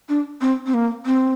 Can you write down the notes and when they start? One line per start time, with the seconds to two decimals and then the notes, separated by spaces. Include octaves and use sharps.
0.09 D4
0.41 C4
0.66 C4
0.74 A#3
1.06 C4